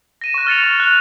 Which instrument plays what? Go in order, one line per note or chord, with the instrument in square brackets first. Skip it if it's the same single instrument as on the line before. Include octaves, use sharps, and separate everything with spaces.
[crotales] A#6 D#7 E7
C#6 F#6
F6 A6 C#7 F7
C#6
F#6 F7